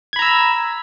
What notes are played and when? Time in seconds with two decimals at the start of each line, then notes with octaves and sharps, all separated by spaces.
0.13 G#6
0.16 B5
0.19 A#5
0.22 E6